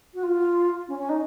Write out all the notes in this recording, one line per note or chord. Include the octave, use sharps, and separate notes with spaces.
F#4
F4
C#4
C#4
D#4